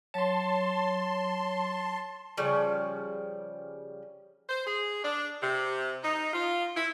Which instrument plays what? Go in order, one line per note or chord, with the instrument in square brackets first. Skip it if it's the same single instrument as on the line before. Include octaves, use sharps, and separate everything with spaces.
[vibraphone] F#3 C#5 [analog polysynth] A5 C6
[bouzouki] C#3 F3 G3
[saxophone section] C5
G#4
D4
C3
D#4
F4
E4